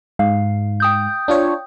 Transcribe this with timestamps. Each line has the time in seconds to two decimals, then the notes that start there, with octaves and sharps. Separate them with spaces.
0.19 G#2 F5
0.80 G5 D#6 G6
1.28 D4 F4 C#5